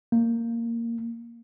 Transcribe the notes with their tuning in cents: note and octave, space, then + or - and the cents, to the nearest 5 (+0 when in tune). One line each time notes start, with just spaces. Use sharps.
A#3 -10